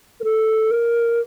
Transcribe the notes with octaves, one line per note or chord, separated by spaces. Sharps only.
A#4
A4
A#4